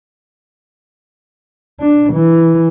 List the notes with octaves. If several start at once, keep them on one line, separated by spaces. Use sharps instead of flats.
D4
E3